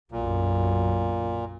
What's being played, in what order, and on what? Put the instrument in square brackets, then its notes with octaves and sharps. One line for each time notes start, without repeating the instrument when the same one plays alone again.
[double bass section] B1 F#2 [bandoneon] A#2